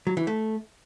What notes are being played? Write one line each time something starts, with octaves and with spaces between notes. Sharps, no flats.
F#3
E3
A3